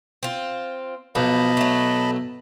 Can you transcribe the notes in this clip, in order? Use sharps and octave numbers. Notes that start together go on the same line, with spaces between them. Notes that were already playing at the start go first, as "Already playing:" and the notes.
C4 F4
B1 F3 D#5 A5 B5
F#3 A3